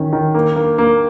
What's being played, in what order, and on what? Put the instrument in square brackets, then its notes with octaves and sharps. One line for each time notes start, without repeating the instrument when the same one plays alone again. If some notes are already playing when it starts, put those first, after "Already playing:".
Already playing: [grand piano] D#3 C#4
D#3
A#3
A#3
A#3